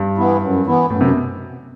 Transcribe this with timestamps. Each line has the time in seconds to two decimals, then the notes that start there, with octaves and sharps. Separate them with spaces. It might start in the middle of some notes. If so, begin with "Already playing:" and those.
Already playing: G2
0.18 E3 B3 E4
0.42 F#2
0.66 E3 B3 E4
0.90 F#2 A2
1.01 C3
1.07 B2